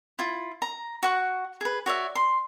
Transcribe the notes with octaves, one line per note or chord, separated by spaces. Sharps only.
E4 F4
A#5
F#4 F#5 C#6
G#4 B4
F#4 C#5 D5 E5
C6